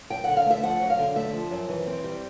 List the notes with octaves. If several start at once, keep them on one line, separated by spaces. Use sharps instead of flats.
F#2 G5
D3 F#5
F5
A3 E5
F3 F#5
F#2
F5
D3
A3 E5
F3
F#2
E3
C4
G3